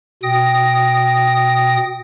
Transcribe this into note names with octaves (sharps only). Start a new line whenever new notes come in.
B2 G5 D#6 A#6